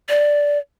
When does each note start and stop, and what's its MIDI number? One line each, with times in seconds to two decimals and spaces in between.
0.09 0.58 74